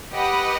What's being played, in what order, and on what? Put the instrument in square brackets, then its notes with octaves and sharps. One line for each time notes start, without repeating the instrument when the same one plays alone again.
[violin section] G4 B4 D#5 F#5